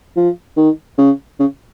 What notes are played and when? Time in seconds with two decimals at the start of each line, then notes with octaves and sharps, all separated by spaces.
0.17 F3
0.57 D#3
0.98 C#3
1.39 C#3